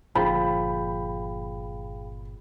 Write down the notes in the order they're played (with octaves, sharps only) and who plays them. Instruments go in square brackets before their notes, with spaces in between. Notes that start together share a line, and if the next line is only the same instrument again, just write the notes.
[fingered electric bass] G1 A#2 [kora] F3 [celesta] G#4 F5 G5 [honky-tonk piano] B5